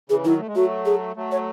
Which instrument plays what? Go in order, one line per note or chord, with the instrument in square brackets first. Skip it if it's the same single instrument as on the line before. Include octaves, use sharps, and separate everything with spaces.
[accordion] C#3 E3 [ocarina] G#4
[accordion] D#3 F#3 [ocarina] E4
[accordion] A3
G#3
[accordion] F#3 A3 [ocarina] F#4
[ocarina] G#4
[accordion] F#3 A3
[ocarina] C#5